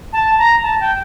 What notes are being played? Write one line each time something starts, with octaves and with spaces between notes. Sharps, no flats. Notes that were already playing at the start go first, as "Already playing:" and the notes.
A5
A#5
A5
G5